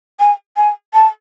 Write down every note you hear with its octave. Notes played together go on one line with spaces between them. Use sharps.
G#5
G#5
A5